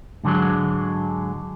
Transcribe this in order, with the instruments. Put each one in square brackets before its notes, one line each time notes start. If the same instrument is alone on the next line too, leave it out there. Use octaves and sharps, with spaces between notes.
[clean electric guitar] G#2 D3 E3 F#3 G#3